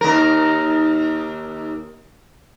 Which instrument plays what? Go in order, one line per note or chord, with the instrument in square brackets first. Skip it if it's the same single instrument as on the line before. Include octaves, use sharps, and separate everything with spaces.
[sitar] D#2 A#4